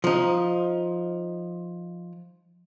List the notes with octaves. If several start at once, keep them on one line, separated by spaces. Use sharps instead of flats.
F3 D#4